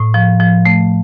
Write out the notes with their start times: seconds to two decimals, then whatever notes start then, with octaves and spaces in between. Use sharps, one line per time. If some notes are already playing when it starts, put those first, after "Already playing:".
Already playing: A2
0.14 F3
0.40 F3
0.65 A3